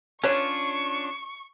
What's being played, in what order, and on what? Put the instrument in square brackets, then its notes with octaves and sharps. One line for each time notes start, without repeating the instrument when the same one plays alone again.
[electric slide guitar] C#4 D4 F4 [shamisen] B4 C#5 [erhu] C#6